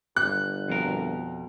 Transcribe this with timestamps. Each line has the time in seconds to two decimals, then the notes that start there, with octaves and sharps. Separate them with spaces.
0.16 G1 F#6
0.68 F2 B2 A#4